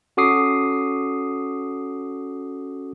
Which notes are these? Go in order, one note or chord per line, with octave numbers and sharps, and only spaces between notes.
C#4 F#4 A4 D6 D#6 C7